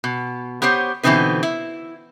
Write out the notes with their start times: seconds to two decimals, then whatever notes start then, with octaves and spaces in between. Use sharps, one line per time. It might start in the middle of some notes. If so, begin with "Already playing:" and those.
0.04 B2
0.62 B3 G4 C5 C#5
1.03 B2 D3 E3 C4 D#4 B4
1.43 E4